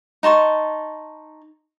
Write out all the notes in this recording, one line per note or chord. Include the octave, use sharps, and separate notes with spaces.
D#4 A5 C6 C#6